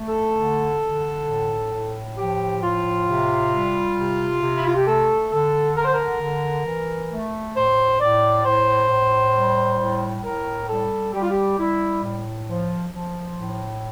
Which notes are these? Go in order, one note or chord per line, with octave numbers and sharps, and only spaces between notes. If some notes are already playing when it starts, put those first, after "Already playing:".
Already playing: A3
A4
D3
D3
A2
A2
F3 G4
A2 F4
C3
G3
C3
C3
E4
F4
G4
A3 A4
D3 A4
D3 A#4
C5
A#4
D3
E3
A3
A2 C5
A2 D5
A2 C5
A2
G3
A2
A2 A#4
G3 A4
G3 G4
F4
G4
G3 E4
A2
F3
F3
A2